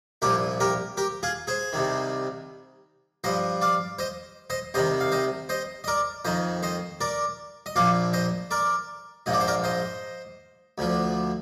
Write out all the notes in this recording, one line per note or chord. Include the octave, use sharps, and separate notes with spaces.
C2 A#2 F3 G4 A#4
G4 A#4
G4 A#4
F4 G#4
G#4 C5
C2 C3 D#3
G2 F3 C5 D#5
D5 F5
C5 D#5
C5 D#5
C2 C3 D#3 C5 D#5
F5
C5 D#5
C5 D#5
D#5
A#4 D5
F2 D#3 C5 D#5
C5 D#5
A#4 D5
D#5
A#1 A#2 F3 D5 F5
C5 D#5
A#4 D5
A#1 G#2 F3 D#5
D5
C5
A#4 D5
C5 D#5
D2 D3 F3